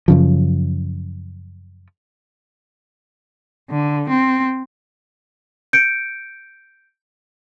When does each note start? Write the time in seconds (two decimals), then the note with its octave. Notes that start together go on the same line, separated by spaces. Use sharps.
0.08 F#2 C#3 F3
3.70 D3
4.10 C4
5.73 G6 C#7 D7